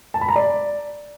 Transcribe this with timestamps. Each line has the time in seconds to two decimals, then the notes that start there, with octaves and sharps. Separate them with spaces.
0.14 A5
0.21 B5
0.29 A#5
0.36 D5